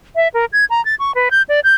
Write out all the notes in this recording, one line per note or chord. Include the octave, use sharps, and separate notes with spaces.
E5
A#4
G#6
A#5
A6
C#6
B4
G6
D5
G6